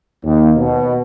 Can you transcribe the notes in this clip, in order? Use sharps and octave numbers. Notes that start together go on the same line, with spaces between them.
D#2
B2